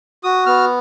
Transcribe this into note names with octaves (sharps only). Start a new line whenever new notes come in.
F#4 D#6
B3 F6